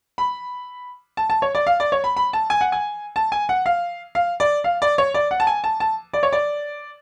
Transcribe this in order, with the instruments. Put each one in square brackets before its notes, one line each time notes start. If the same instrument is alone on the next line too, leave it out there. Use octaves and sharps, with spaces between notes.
[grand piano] B5
A5
A5
C#5
D5
F5
D5
C#5
B5
B5
A5
G#5
F#5
G#5
A5
G#5
F#5
F5
F5
D5
F5
D5
C#5
D5
F#5
A5
G#5
A5
A5
D5
C#5
D5